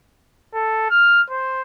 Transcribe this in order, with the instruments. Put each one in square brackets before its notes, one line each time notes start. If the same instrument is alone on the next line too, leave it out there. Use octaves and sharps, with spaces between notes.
[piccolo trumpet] A4
F6
C5